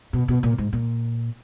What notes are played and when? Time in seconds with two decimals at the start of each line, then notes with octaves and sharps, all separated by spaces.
0.13 B2
0.28 B2
0.43 A#2
0.58 G#2
0.73 A#2